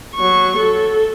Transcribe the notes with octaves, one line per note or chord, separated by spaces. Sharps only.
F#3 C#6
A4